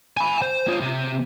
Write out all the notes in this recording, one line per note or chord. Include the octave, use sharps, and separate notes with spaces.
G#5 B5
C5
F4 C#5
C3